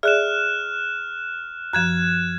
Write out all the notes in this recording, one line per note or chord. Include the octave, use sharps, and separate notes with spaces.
G#4 D5 E5 F6 F#6 E7
F#2 F3 F#6 G#6 E7